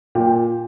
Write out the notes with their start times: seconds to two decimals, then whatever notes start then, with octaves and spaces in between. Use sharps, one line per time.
0.15 A#2 G5